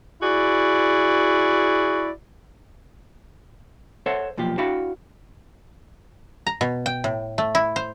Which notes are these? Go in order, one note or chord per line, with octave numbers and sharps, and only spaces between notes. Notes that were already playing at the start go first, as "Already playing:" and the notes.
E4 F#4 G#4 D5
A4 C5 C#5 E5 F#5
B1 A#2 F3 G4
D4 E4 F#4 F5 G5 B5
A#5
B2
G5
A2
A3
E4
C5